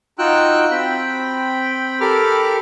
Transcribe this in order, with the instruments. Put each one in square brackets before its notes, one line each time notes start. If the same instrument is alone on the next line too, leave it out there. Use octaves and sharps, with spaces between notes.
[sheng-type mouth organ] D#4 F4 F#4 G5 E6 F#6
C4 G5 B5
G4 A4 A#4 B5 D6 F6